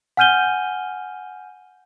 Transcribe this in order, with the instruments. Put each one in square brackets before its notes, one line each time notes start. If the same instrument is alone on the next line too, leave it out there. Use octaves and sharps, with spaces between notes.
[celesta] F#5 G#5 F6 G6 D#7 G7